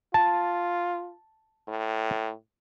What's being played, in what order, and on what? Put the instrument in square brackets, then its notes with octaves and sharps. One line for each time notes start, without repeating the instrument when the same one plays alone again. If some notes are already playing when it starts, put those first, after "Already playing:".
[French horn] F4 [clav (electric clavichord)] A5
[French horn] A2